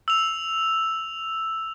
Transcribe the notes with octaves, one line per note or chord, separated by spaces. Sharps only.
E6 F7